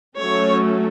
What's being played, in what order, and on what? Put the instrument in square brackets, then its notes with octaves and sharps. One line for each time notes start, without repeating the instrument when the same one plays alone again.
[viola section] F#3 A3 C#4 C#5